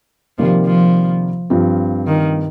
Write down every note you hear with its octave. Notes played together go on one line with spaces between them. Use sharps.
C3 D#3 F3 G3 A#3
F3
G2 F3 C4 F4
D#3